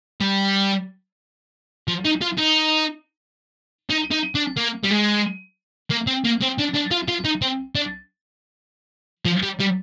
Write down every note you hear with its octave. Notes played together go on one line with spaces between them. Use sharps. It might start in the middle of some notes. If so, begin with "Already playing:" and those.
G3
F3
D#4
F4
D#4
D#4
D#4
D4
A#3
G3
G#3
A#3
C4
A#3
C4
D4
D4
F4
F4
D#4
C4
D4
F3
G3
G3